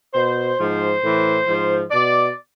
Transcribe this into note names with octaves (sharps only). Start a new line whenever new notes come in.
B2 C5
G#2 F3 C5
A2 E3
G#2 F3
B2 D5